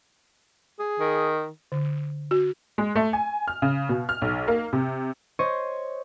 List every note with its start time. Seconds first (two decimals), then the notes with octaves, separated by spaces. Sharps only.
0.79 G#4
1.00 D#3
1.72 D3
2.31 F#4
2.78 G#3
2.96 A3
3.13 G#5
3.48 F6
3.62 C#3
3.89 B2
4.09 F6
4.22 B1
4.48 A#3
4.73 C3
5.39 C5 C#5 D#5 C#6